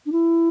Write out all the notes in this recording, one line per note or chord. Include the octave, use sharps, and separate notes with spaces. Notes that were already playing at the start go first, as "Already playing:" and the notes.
D4
E4